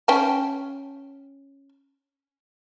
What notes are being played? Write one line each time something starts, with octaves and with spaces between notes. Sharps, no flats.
C#4 G5 A5